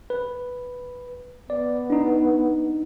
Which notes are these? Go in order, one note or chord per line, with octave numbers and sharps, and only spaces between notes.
B4
B3 D5
D4 D#4